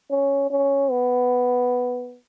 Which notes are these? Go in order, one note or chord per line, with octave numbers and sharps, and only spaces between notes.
C#4
C#4
B3